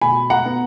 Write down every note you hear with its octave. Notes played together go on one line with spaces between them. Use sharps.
B2 G#5 B5
F#5 A#5
B3